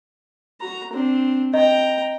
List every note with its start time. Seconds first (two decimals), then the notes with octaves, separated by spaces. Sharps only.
0.61 F#4 A#5
0.92 C4 D4
1.54 D#5 G5 A#5